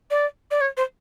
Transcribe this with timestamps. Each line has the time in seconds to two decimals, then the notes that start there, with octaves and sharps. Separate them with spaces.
0.11 D5
0.51 D5
0.61 C#5
0.77 C5